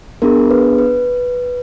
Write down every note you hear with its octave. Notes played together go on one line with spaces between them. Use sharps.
B3 D4 G#4 A#4
B4
B4